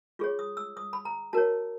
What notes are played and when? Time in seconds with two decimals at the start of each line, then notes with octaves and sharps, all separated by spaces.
0.19 F4 G#4 C#5 C#6
0.39 D#6
0.57 E6
0.77 D#6
0.93 B5
1.05 A#5
1.33 F#4 A#4 C#5 A5